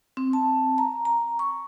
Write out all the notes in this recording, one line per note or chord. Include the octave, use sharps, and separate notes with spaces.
C4
A5
A#5
A#5
C#6